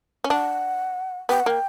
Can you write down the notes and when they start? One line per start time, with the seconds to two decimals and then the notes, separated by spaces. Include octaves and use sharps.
0.24 C#4
0.30 D4 F#5
1.29 B3 G5
1.40 F#5
1.46 A#3 G5